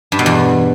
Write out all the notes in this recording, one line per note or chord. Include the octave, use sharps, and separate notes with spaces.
G2
B2
E2